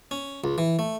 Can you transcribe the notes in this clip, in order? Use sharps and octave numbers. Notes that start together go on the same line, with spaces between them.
C#4
C#2
E3
A3